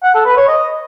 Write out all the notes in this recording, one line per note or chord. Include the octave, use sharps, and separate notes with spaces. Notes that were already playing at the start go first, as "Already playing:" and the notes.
F#5
A4
B4
C#5
D#5